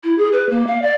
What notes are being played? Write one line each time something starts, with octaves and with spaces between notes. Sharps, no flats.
E4
G#4
B4
A#3
F5
D5